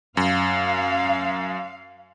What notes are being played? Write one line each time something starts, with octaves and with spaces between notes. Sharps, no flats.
F#2 F5